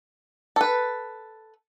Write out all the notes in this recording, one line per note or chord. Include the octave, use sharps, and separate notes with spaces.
A4 B4